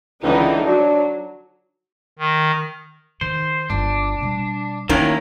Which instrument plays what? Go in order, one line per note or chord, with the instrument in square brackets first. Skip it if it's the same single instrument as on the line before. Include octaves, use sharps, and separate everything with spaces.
[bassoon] C#2 [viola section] D3 E3 D#4
[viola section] F#3 [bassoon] D4
[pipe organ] D#3
[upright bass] D#3 [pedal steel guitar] C5
[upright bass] G1 F4 [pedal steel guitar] D4
[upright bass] B2 G3
[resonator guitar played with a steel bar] A2 D#3 C#4 [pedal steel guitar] F#3 A#3 E4 [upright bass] D4